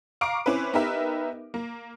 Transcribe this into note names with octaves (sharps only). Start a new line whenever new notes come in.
F5 A#5 C#6 D6 C7 D7
C4 C#4 E4 B4
B3 D#4 G4 A#4 B4 E5
A#3